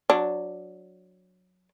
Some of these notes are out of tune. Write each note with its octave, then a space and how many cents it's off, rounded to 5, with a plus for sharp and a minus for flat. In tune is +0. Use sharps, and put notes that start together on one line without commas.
F#3 -15 D4 +0